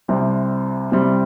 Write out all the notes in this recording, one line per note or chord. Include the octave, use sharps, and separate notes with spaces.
C2 C3 G3 C4
C2 C3 G3 C4